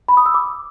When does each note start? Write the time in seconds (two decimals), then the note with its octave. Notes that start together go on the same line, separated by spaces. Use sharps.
0.08 B5
0.17 D#6
0.26 E6
0.34 D6